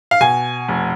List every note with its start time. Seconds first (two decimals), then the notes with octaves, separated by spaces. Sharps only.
0.11 F5
0.21 B2 G#5
0.68 F1